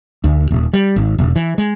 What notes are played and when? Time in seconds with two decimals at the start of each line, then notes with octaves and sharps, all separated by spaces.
0.24 D2
0.51 D#1
0.73 G3
0.96 G#1
1.18 E1
1.36 E3
1.58 G#3